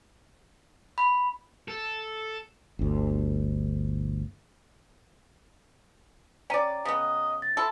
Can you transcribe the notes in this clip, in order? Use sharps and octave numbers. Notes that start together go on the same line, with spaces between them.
B5
A4
G1 D2
C#4 D5 G5 A#5 D#7
C#3 B3 D#5
A6
E4 F4 A4